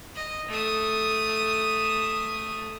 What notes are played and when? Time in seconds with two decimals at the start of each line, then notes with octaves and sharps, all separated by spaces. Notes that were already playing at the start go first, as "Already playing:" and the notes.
0.15 D#5
0.48 A3 D#6